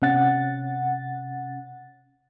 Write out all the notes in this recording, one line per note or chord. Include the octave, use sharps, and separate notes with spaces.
C3 C#4 F#5 A6